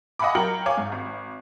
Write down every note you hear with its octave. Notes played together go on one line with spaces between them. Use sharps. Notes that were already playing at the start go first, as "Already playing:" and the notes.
D#5 F5 F#5 G#5 B5 D6
F#3 A#4 G5 F6 C#7 F#7
C#5 F5 G#5 D6
G#2
G#1